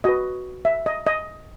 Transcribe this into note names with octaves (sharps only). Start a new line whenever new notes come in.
F#4 B4 D#5
E5
D#5
D#5